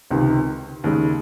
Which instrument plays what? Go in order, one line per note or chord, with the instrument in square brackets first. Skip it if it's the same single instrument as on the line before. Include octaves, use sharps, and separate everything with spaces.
[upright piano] C#2 C3 D#3
D#2 C#3 G#3